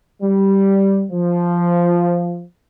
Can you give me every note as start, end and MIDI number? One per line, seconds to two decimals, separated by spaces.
0.22 1.06 55
1.12 2.43 53